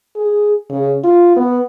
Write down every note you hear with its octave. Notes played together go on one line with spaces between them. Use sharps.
G#4
C#3
F4
B3